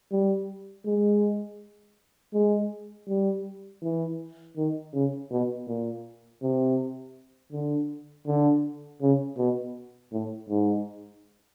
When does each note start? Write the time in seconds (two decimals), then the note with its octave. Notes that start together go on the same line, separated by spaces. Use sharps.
0.12 G3
0.86 G#3
2.34 G#3
3.08 G3
3.83 E3
4.57 D#3
4.93 C#3
5.31 B2
5.68 A#2
6.42 C3
7.52 D3
8.27 D3
9.02 C#3
9.38 B2
10.12 A2
10.49 G#2